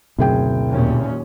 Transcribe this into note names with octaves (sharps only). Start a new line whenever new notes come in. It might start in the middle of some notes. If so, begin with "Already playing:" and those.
F#1 D2 B2 C4 G#4 G5
D#2 A#2 C#4